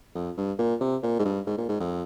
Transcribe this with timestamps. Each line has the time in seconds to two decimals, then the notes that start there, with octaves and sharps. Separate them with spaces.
0.15 F2
0.37 G2
0.59 A#2
0.81 C3
1.03 A#2
1.19 G#2
1.25 G2
1.47 G#2
1.58 A#2
1.69 G#2
1.80 F2